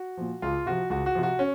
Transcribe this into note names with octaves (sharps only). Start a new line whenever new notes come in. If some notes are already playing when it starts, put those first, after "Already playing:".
Already playing: F#4
A#2 F3
C#2 F4
C3 F3 F#4
C#2 F#4
F#4
C3 F3
F#4
C#4